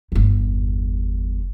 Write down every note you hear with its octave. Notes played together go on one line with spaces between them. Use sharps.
G1 E2